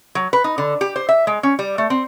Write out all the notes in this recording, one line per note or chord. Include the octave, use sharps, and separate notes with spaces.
F#3
B4
D#4
D3
G4
C5
E5
G#3
C#4
G3
A3
C4